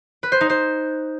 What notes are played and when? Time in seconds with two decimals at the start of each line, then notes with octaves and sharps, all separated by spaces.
0.23 B4
0.32 C5
0.41 D#4
0.50 C5